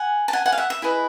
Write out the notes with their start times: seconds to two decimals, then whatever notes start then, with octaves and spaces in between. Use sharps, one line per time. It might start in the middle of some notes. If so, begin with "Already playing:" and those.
Already playing: F#5 G#5
0.28 A5
0.33 F#5 G#5
0.46 F#5 G#5
0.52 F5
0.58 E5 F#5
0.70 E5
0.82 E4 G#4 B4 D#5